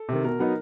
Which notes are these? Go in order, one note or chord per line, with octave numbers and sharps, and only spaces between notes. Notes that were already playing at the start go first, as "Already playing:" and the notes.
Already playing: A4
C3 D#3
B2 A#4
F#3 B3 D#4